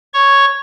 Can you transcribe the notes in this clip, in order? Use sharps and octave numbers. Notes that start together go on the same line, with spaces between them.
C#5 C#6